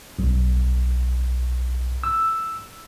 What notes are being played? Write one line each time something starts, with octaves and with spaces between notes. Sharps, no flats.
B1
E6